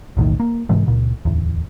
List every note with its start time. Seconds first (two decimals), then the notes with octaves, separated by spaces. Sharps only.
0.17 B1 E2 A2 D#3
0.40 A#3
0.69 G#2 C3 E3 G#3
0.86 C#2 A#2
1.25 D1 E2